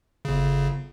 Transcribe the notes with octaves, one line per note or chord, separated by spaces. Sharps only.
G1 C#3